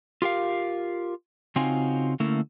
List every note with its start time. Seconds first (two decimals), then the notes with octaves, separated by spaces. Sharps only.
0.22 F4 G4 A#4 F5
1.56 C#3 C4 D#4 F4 F#4 G#5
2.20 D3 A3 A#3 C#4 E4